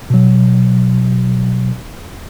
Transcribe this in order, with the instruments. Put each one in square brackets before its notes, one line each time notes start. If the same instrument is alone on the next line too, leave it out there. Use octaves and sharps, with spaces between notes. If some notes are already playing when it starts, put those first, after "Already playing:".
[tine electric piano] B2 F#3